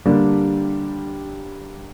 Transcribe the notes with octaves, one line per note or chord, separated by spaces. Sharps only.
D3 G3 A#3 D4 G4